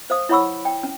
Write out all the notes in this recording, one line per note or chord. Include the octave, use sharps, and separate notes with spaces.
C5 F5 D#6
E4 C#5 F#5 B5 C#6 E6
G5
C#4